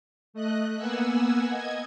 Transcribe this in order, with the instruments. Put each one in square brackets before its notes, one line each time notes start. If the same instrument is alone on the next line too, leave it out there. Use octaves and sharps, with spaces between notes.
[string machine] A3 D#5 F#6
A#3 B3 F#5 G#5 E6
D#5 G#6